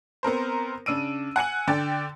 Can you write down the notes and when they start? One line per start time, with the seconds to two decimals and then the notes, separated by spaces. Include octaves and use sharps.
0.23 B3 C4 A#4 C5
0.86 C#3 D4 E6 D7 D#7
1.36 F#5 G#5 C#7 F#7
1.68 D3 D5 G5 A6